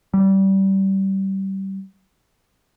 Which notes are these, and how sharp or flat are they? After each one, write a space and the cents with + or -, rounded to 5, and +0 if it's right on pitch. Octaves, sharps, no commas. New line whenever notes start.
G3 -25